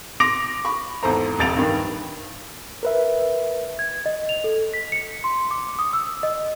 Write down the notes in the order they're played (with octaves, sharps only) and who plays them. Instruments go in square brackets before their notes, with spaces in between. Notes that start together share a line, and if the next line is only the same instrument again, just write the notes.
[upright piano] C6 D6 A#6 D7 F7
B5 C#6
G#1 E2 A4 C5 A#5
D#1 C2 F2 A6 D7 F7
G2 D#3
[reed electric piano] A#4 B4 E5
[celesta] G#6
D#5
F7
A4
B6
C#7
C6
D6
D#6
E6
D#5